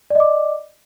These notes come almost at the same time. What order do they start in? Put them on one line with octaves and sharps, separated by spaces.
D5 D#5 D6